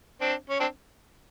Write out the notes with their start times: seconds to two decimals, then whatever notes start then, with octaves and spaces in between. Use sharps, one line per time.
0.21 C4 D4
0.49 C#4
0.60 C4 D4